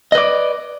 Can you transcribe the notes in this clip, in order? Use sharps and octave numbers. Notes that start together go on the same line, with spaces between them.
B4 D5 D#5